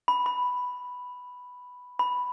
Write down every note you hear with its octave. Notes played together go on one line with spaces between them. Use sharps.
B5
B5
B5